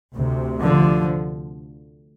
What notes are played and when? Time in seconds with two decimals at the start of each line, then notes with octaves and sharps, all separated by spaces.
0.15 D2 C3
0.61 D3 F3